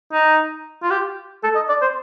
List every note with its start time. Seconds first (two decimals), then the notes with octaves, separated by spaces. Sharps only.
0.13 D#4
0.82 F4
0.90 G4
1.44 A4
1.55 D#5
1.69 D5
1.82 C5